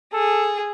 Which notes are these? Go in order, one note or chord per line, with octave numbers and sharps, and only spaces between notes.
G#4 A4